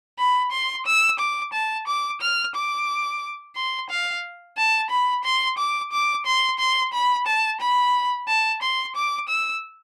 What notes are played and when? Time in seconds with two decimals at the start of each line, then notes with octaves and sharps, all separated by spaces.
0.19 B5
0.52 C6
0.86 E6
1.19 D6
1.53 A5
1.87 D6
2.21 F6
2.55 D6
3.56 C6
3.90 F5
4.57 A5
4.90 B5
5.24 C6
5.58 D6
5.92 D6
6.26 C6
6.59 C6
6.93 B5
7.27 A5
7.60 B5
8.28 A5
8.62 C6
8.96 D6
9.29 E6